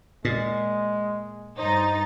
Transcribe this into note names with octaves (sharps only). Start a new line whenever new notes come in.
A#2 G#3
G2 D#4 C5 A6